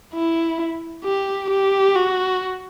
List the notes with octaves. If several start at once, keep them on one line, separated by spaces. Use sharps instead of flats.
E4
G4
G4
F#4